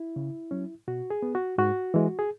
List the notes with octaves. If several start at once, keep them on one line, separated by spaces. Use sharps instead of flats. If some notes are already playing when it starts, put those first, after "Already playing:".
Already playing: E4
C#3
F#3 C#4
B2 F#4
G#4
B3
F#4
G#2 F#4
E3 G#3
G#4